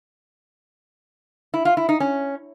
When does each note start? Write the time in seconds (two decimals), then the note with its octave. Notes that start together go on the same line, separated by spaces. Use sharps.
1.54 E4
1.65 F4
1.77 E4
1.89 D#4
2.00 C#4